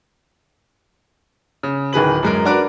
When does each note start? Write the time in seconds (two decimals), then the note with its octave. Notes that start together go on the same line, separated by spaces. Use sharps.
1.63 C#3
1.93 D1 D#3 G#4 B4 F#7
2.23 F#2 G#3 A#4
2.45 D4 F#4 A#4 B4 D5